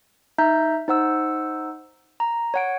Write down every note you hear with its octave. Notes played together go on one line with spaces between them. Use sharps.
D#4 E5 A#5 G6
D#4 C5 F#5 E6
A#5
C#5 F#5 D7